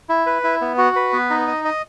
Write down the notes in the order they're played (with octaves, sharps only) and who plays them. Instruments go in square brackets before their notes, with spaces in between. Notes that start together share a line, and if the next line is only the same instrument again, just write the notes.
[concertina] E4
B4
E4
B3
F#4
B4
B3
D#4
D#5
D#5